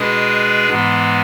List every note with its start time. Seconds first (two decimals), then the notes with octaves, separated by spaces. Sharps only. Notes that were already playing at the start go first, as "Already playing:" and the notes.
Already playing: B2 G#3 D4 G#4 B4
0.69 G#2 E3 G#3 B3